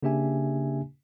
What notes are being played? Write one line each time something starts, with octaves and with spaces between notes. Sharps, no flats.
C#3 A#3 D4 G4 E5 G#5